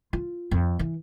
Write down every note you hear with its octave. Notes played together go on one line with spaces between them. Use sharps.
F4
F2
E3